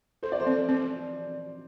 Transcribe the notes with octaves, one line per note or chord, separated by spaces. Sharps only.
A4 C5
D5
C5
C4
C4 C5